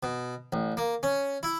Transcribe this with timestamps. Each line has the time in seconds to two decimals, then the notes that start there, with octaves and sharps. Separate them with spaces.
0.03 B2
0.53 A1
0.77 A#3
1.03 C#4
1.43 E4